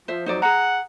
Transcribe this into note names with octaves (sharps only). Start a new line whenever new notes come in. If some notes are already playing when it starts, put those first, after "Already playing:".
F3 C5 E5
F2 F#3 D#4 C5 D5
G#4 F#5 A#5